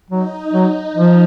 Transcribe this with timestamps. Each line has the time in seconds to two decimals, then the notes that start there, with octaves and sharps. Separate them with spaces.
0.10 F#3 D#4
0.53 F#3
0.96 F3